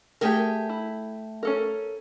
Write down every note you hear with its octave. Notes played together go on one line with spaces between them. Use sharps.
A3 G4 G#4 A#4 E5 G5
E4
C#4 A4 A#4